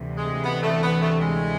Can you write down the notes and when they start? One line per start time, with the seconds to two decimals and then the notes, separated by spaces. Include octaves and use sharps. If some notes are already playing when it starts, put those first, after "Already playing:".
Already playing: D2 C3 E3
0.18 G#3
0.44 B3
0.63 A3
0.83 B3
1.02 A3
1.21 G#3